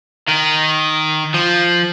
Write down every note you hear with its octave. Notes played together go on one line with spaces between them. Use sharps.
D#3
F3